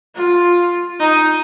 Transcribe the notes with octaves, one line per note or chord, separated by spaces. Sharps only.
F4
D#4